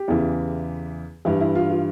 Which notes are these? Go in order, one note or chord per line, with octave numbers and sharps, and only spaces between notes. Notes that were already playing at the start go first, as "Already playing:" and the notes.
Already playing: G4
E2 C#3 E3
G2 E3 E4
E4
F4
F4